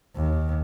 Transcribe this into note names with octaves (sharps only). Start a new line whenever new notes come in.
D#2